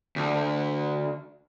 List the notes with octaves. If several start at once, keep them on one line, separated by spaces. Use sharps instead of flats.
D2